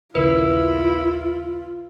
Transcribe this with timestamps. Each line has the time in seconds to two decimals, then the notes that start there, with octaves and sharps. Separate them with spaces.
0.15 A#1 D#2 C#3 E4 F4 A#4 B4